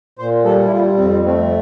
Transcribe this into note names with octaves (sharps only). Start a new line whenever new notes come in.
A#2 C5
G3 A4
E4
G3 F4
F2 C4
A3 C4